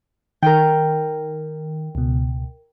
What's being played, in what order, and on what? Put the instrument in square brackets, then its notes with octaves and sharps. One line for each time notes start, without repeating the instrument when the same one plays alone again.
[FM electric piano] D#3 [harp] A#4 G5
[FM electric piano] C#2 B2